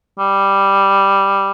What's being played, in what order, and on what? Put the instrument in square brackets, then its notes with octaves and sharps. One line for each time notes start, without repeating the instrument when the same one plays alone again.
[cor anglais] G3